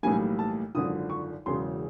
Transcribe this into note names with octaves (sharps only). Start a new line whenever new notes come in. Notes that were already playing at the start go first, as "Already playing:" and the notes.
B1 A2 E3 G3 A#3 G#5
A5
G#1 F#2 D3 F3 D#6
C#6
E1 E2 C#3 F#3 C6